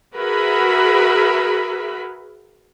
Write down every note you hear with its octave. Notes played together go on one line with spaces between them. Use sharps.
F#4 G#4 A#4 B4 E5 B5